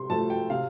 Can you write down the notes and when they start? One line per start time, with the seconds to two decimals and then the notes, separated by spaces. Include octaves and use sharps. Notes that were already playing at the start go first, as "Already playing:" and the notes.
Already playing: C3 C6
0.10 F3 A3 A5
0.30 G5
0.50 C3 F5